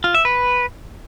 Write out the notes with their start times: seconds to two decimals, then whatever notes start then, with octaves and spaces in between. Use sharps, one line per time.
0.04 F4
0.15 E5
0.25 B4